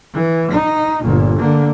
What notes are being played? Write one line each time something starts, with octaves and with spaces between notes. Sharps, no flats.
E3
D#4
G1 A#2
D3 A#3